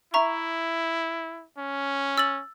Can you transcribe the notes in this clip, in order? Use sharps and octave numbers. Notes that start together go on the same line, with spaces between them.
E4 E5 A#5 C#6
C#4
E6 A6 F#7